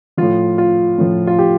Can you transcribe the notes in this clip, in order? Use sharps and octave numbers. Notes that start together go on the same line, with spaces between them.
A2 F3 F4
F4
A2 F3
F4
G4